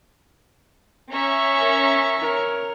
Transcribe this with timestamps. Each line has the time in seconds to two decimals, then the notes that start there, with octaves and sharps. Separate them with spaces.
1.12 C#4 E5 A#5 C#6
1.58 A#4
2.18 A#4 C#5